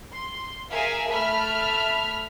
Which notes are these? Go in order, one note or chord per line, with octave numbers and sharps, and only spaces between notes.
C6
G#4 A#4 E5 F5 G#5
A3 E5 A5 B5 F6